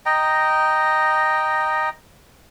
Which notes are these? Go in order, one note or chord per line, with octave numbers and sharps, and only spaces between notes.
D#5 G5 A#5